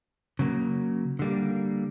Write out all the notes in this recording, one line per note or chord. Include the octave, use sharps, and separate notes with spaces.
C#3 F#3 A#3
D3 G3 A#3